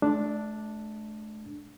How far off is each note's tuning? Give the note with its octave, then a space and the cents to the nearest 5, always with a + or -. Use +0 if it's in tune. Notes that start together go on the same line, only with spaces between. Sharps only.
A3 -40 D4 +0